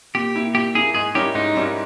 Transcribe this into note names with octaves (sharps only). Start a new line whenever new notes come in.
A#2 G4
A#3 E4
A#2 G4
A#3 E4 G#4
G#2 G#4
G3 C#4 E4 G4 A#4
G#2 D#4
G3 C#4 E4 A#4